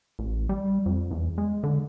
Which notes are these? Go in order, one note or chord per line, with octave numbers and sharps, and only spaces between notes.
A1
G3
F2
E2
G#3
D3